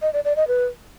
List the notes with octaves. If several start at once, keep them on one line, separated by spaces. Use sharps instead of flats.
D#5
D5
D5
D#5
B4